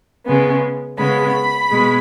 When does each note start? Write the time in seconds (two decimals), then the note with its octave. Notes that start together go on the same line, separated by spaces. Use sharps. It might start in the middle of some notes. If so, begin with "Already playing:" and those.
0.26 C#3 G#3 B3
0.98 C#3 G#3 B3 B5
1.70 B2 G#3